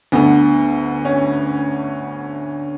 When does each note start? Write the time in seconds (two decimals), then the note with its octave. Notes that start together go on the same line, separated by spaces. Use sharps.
0.12 D2 D3 B3
1.05 C#4